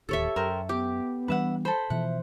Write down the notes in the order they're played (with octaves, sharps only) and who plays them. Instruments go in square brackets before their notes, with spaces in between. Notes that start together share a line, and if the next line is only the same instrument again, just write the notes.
[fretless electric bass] D1 D#2 [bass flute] G4 [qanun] A4 C#5 E5
[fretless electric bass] F#2 [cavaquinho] A#4 C5 G5
[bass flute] B3 [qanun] G4 [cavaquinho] D6
[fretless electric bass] E3 G3 D4 [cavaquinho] B4 E5 F#5
[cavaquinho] A4 B5 [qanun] C5
[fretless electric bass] B2 E3 F3 [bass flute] E5 [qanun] F#5